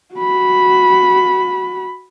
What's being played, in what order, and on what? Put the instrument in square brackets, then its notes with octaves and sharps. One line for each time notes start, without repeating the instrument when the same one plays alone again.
[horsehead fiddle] F#4 B5